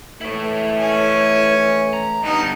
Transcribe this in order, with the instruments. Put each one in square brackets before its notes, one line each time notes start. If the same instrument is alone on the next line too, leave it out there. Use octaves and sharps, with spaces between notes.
[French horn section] A2 E3 A3 [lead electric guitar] E4 C#5
[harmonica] C#4 G#5
[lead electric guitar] A#5
[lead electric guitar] G2 B3 [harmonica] D#4